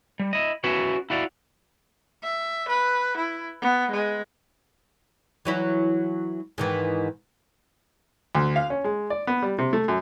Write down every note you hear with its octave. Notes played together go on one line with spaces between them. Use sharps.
G3
E4 D#5
C#4 E4 F#4 B4 C#5
E4 F#4 D5 F5
E5
B4
E4
B3
G#3
E3 F#3 E4
G#2 D#3 E3
D2
F5
C#4
G#3
D5
B3
G3
C3
A3
F#2